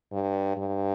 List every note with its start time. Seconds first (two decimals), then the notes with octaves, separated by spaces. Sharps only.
0.12 G2
0.57 G2